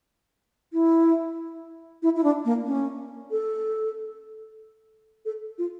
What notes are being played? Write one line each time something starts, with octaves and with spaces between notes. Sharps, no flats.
E4
E4
E4
D4
A#3
C#4
A4
A4
F4